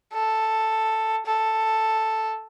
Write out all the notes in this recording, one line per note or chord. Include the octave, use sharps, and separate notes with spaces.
A4
A4